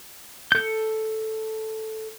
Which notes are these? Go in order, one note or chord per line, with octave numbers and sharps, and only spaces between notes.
A4 G6